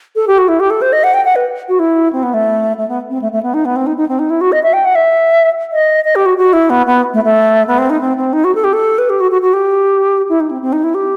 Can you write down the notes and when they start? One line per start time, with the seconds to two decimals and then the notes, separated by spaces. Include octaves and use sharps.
0.16 A4
0.28 G4
0.38 F#4
0.48 E4
0.60 G4
0.70 A4
0.82 C5
0.93 D#5
1.04 F#5
1.14 G5
1.25 F#5
1.36 B4
1.69 F#4
1.79 E4
2.13 C4
2.23 B3
2.34 A3
2.78 A3
2.88 B3
3.10 C4
3.22 A3
3.32 A3
3.43 B3
3.54 D#4
3.65 B3
3.76 C4
3.87 D#4
3.97 D#4
4.09 C4
4.19 D#4
4.30 E4
4.41 F#4
4.52 D#5
4.63 E5
4.73 G5
4.85 F#5
4.95 E5
5.72 D#5
6.05 D#5
6.15 G4
6.26 F#4
6.38 F#4
6.53 E4
6.70 B3
6.87 B3
7.14 A3
7.24 A3
7.67 B3
7.78 C4
7.90 D#4
8.01 C4
8.17 C4
8.33 D#4
8.44 F#4
8.55 A4
8.64 G4
8.73 A4
8.98 B4
9.10 G4
9.20 F#4
9.31 F#4
9.42 F#4
9.53 G4
10.29 E4
10.40 D#4
10.51 C4
10.62 C4
10.73 D#4
10.84 E4
10.95 G4